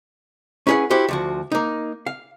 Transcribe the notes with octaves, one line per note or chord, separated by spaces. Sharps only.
C#4 E4 G#4 B4 F#5
E4 F#4 G4 C5
D2 F3 F#4
A#3 D#4
F5